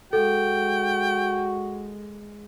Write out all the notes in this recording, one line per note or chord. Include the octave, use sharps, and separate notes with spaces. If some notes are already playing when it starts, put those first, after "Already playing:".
G#3 F#4 A4 G5